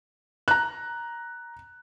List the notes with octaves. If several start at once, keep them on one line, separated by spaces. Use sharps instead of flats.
A#5 F#6